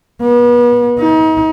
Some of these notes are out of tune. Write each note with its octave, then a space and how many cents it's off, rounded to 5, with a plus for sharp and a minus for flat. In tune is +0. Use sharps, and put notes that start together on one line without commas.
B3 -35
D#4 +35